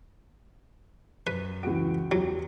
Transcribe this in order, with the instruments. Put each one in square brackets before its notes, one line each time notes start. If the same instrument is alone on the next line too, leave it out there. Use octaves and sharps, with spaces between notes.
[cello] F#2 [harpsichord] B4
[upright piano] C#2 F#4 [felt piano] E3 D7
[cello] E2 [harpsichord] F#3 [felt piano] F4 G4